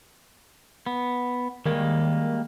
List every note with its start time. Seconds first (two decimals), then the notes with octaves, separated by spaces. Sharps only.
0.86 B3
1.66 D#3 G3 G#3 A#3